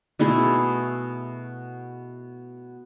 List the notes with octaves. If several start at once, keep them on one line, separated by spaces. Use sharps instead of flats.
B2 A3 E4 G#4